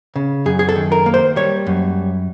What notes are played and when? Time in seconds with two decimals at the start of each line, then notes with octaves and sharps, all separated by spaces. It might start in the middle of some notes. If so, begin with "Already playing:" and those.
0.16 C#3
0.46 F#2 G#4
0.59 G#4
0.69 A4
0.76 D#3
0.92 A#4
1.06 A#3
1.14 C5
1.36 G3 C#5
1.67 F#2